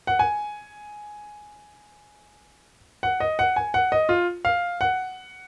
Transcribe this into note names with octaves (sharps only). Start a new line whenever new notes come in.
F#5
G#5
F#5
D#5
F#5
G#5
F#5
D#5
F4
F5
F#5